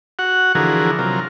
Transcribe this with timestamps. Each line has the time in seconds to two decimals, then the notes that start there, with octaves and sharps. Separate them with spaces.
0.19 F#4 F#5
0.55 D3 E3 F3 F#4 G#4 A#4
0.99 C3 F#3 F4 A#4